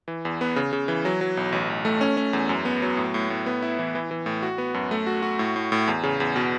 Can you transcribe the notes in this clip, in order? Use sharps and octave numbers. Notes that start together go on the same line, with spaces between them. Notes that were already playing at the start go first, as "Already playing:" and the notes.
E3
E2
B3
C#3
C#3
E3
F#3
F#3
B1
A1
A1
A3
C#4
C#4
E2
F#2
B3
F#3
A2
A2
A2
B3
E4
E3
E3
E3
A2
F#4
B3
F#2
A3
F#4
F#4
A2
A2
A2
E2
C#3
E2
B2